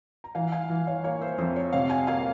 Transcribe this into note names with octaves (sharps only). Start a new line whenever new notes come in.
A#5
E3 F5 G#5
F5 G#5
E3
C#5 F5
A#3 C#5
C5 E5
F2 C5 E5
C#5
C3 C#5 F5
F5 G#5
A#3 F5 G#5